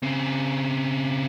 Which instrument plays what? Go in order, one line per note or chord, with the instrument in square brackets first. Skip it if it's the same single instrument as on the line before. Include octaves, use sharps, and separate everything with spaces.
[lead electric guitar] C#3 C4